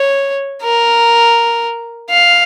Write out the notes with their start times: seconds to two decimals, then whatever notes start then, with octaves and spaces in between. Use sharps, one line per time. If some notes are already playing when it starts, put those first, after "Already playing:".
Already playing: C#5
0.63 A#4
2.10 F5